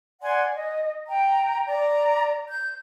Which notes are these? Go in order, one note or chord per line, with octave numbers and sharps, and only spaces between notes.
D5 F#5 G#5 C6
D#5
G5 A#5
D5 A#5
G6